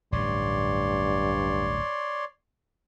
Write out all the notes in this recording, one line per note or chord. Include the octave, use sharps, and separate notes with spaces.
D1 A1 G2 C#5 D5 C6